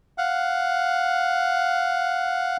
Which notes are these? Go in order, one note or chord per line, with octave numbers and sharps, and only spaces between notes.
F5 F#5